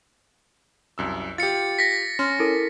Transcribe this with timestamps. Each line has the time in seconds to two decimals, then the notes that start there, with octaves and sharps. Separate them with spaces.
0.98 C2 F#2 E6
1.38 F4 G4 A6 C#7
1.79 A#6 B6
2.19 C#4 C6 F6
2.39 E4 A4 A#4